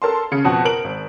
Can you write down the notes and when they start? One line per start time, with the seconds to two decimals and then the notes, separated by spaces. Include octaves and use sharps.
0.02 A4 A#4 A5 C6
0.32 C#3 C#7
0.45 F2 B2 F#5
0.65 A#4 D7 F#7
0.84 G#1